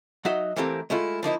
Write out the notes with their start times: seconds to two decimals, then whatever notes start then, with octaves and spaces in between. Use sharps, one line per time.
0.25 F#3 D#4 F#4 D#5 E5
0.56 E3 A3 A#3 C4 G4 A#4
0.90 G#3 A3 E4 F4
1.23 F3 A#3 D#4 E4